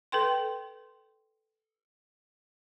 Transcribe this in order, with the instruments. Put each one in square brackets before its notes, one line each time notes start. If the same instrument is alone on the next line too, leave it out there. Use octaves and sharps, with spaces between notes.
[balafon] A4 B4 G5 C6